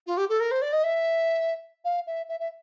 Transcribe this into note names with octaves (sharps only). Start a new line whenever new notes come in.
F4
G4
A4
A#4
C5
D5
D#5
E5
F5
E5
E5
E5